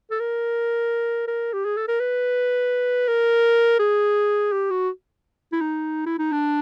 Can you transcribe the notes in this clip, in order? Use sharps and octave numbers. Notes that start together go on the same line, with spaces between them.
A4
A#4
A#4
G4
G#4
A4
A#4
B4
A#4
G#4
G4
F#4
E4
D#4
E4
D#4
D4